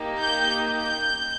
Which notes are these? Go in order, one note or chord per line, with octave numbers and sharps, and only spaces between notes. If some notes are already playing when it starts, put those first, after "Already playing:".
Already playing: A#3 D#4 G4
G6
G6